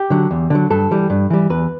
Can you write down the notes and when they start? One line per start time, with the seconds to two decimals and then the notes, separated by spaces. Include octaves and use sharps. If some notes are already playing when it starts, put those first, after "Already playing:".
Already playing: G4
0.10 D3 F#3
0.31 E2
0.50 D3 F#3
0.70 G2 A4
0.91 E3 G3
1.10 G2
1.30 E3 G3
1.50 E2 B4